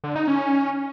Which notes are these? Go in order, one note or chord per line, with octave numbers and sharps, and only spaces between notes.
D3
D#4
C#4